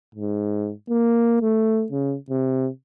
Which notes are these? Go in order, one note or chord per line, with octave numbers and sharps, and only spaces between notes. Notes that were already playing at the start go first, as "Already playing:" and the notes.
G#2
A#3
A3
C#3
C3